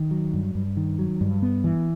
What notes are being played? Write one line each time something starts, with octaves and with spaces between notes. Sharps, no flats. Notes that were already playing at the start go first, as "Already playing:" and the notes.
Already playing: D#3
F#3
G2
G2
D#3
F#3
G2
B3
E3